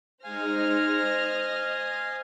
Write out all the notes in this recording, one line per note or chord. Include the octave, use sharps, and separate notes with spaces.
G#3 D#4 C5 F5 G#5 F6 A#6
D#5